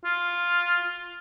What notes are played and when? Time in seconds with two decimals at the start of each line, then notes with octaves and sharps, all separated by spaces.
0.05 F4